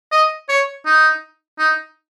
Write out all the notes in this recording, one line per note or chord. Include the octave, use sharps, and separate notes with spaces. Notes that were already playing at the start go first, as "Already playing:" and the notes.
D#5
C#5
D#4
D#4